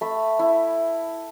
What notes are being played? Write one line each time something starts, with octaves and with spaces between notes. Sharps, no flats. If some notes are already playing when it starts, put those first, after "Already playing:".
A3 B5
E4